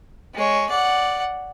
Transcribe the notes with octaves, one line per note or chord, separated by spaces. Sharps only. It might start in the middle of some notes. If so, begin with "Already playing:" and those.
G#3 C#5
D5 F#5